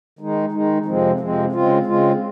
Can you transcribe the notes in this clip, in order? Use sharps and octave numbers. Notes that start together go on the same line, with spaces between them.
D#3 G#3 D#4
D#3 G#3 D#4
F2 C3 F3 G#3 C4
F2 C3 F3 G#3 C4
C#3 G#3 C4 F4
C#3 G#3 C4 F4